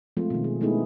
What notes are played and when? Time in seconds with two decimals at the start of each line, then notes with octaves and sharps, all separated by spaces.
0.17 F3 G#3 A3 C4 F4
0.30 B2 D#3
0.44 G#4
0.61 G#3 A3 B3 D#4 E4 G#4